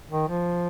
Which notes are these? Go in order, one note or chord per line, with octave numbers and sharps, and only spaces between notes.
D#3
F3